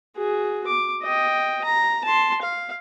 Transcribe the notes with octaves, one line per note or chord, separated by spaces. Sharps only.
F#4 G#4
D6
D#5 G5
A#5
A5 C6
F5